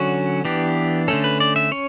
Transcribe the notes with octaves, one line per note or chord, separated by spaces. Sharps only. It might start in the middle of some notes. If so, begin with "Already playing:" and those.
Already playing: D3 F#3 C#4 F#4
E3 B3 D4 G4
D3 A3 C#4 A4
B4
D5
E5
C#4 C#5